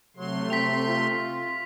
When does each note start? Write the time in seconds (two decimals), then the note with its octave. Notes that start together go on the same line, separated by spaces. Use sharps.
0.17 C3 F#3 A3 C6
0.50 C4 B6 F7
0.88 F4